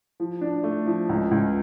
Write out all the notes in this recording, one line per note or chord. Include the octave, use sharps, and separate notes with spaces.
F3
D4
A3
F3
C#2
C#2